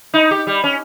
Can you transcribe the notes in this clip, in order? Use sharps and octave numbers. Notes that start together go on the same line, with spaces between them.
D#4
G4
G3
C#4